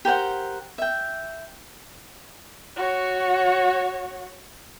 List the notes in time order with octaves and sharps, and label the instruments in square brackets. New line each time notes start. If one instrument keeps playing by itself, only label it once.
[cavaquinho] G4 A#4 C5 F#5
E5 G5
[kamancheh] F#4 C#5